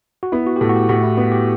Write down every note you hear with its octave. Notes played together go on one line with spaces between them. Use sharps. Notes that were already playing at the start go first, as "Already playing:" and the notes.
F#4
B3 E4
F#4
G4
A2 A4
F#4
G4
A2 F#4
E4
B3
G4